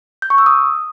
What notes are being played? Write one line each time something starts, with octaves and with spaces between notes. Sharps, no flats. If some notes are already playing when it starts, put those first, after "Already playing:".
G6
C#6
E6
D#6